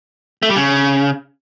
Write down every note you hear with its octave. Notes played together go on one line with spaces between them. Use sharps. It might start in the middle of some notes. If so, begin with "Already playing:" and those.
A3
G3
C#3